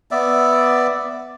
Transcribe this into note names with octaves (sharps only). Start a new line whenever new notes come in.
B3 D5 E5